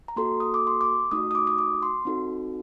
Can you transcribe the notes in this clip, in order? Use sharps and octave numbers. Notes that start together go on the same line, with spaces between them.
A#5
A#3 F#4 A4 C6
D#6
D6
C6
D6
A3 D#4 F#4 D#6
D#6
D6
D#6
D6
C6
C4 D#4 F#4 A4